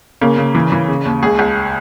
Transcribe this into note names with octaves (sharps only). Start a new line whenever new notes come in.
C#3 A#3
C#3
E3
E3
C#3
D#2
C#2 G#4
C#2